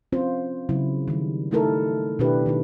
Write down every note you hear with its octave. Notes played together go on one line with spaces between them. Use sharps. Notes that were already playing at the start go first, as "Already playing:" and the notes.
C4 C#4 F4 C5
C#3 F#3 E4
D#3 G3
G3 A3 D#4 E4 A4 A#4
B2 D#3 D4 E4 G4 B4
D#3 B3 D#4